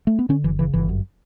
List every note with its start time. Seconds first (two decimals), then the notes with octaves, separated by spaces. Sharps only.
0.07 A3
0.19 B3
0.29 D3 C#4
0.44 F#1 E3
0.59 C#3 E3
0.74 G1 E3
0.89 F#2